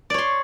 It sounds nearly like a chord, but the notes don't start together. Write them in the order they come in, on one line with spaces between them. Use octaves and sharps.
D5 C#5 C6